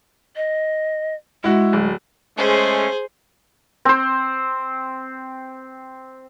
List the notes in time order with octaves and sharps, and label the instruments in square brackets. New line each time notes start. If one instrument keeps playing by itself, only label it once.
[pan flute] D#5
[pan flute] G#3 [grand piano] E4 F#4
[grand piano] D1
[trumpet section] G#3 A3 C#4 [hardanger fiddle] G#4 C5
[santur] C4 C5